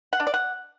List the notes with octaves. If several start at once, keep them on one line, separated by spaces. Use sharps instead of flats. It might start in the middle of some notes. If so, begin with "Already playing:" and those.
F#5
D4
D5
F#5